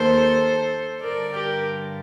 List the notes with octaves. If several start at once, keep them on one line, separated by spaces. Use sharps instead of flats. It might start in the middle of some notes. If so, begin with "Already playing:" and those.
Already playing: D#2 D#3 A4 C5
G2 D3 A#4 D5
G4 A#4